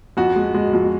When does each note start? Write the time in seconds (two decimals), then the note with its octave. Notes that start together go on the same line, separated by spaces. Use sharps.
0.17 F2 F#4
0.36 G#3
0.54 G#3
0.73 F2